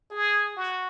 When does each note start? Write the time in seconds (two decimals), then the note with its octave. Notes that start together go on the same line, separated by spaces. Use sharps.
0.11 G#4
0.56 F#4